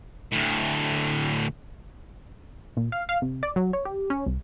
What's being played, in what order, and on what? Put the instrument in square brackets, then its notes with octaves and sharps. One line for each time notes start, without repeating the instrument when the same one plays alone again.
[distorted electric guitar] D2 A2
[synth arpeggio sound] A#2
F5
F5
C3
D5
F#3
C#5
G4
C#4
C2